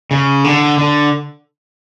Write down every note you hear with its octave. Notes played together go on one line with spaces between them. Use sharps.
C#3
D3
D3